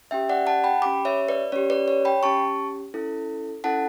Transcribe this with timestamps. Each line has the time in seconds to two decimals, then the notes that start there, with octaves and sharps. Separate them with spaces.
0.11 C#4 G4 E5 G5
0.29 D5 F#5
0.47 F#5 A5
0.64 G5 B5
0.82 G4 B5 D6
0.86 C#4
1.05 C#5 E5
1.28 B4 D5
1.52 C#4 G4 C#5
1.70 B4 D5
1.88 C#5
2.05 G5 B5
2.23 C#4 G4 A5 C#6
2.94 C#4 E4 A4
3.64 C#4 E4 A4 F#5 A5